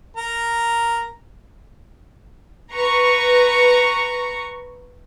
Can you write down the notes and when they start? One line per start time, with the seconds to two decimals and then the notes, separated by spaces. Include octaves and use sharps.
0.17 A#4 A#5
2.72 B4 A#5 C#6